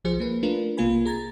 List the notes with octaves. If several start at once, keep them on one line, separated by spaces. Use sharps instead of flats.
B1 F3 G#4 C5 C#7
A#3 B4
A3 D4 F4 A#4 B4
B1 C3 A#3 F4 G#5 B5
G#4 A#5 G#6 A6